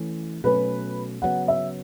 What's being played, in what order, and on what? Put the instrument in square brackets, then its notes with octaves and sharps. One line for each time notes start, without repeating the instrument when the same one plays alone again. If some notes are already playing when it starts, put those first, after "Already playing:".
Already playing: [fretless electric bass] E3 A3 C#4
[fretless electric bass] B2 F#3 A3 C#4 [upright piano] B4
[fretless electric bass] C#3 F#3 B3 [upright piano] F#5
[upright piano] E5